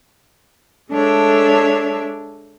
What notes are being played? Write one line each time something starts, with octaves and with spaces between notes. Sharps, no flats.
G#3 D4 A4 C#5 E5